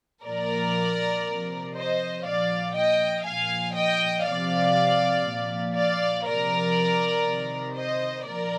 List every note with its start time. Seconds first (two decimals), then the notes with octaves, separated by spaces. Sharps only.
0.24 A#2 F3 A#4 D5
1.25 C3 F3
1.74 C5 D#5
2.24 A#2 F3 D5 F5
2.75 D#5 G5
3.24 A#2 F3 F5 G#5
3.74 D#5 G5
4.25 C3 F3 D5 F5
5.25 A#2 F3
5.75 D5 F5
6.25 C3 F3 A#4 D5
7.25 C3 D#3
7.75 C5 D#5
8.26 A#2 F3 A#4 D5